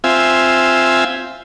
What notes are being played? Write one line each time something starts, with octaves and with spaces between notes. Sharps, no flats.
C4 F4 E5 G#5